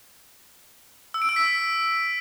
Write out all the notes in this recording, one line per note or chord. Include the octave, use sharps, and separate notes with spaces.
E6
D7
E6
B6